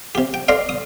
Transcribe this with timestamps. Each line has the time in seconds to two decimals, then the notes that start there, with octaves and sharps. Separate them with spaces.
0.15 C3 G4
0.34 G5
0.48 A4 C5 D5 D#5 F5
0.69 D#6